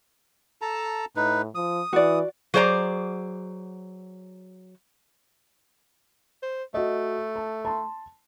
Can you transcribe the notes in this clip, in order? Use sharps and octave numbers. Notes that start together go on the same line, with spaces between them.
A4 A5 A#5
A2 D#4 B4
F3 D#6
E3 F#4 D5
F#3 G#4 C5 D5 A#5
C5
A3 F#4 D#5
A5
A5 C6